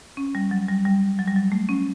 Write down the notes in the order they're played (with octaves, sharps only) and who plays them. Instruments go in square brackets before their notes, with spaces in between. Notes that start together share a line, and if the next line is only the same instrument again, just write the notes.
[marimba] C#4
G3
F#3
G3
G3
F#3
G3
F#3
A3
C#4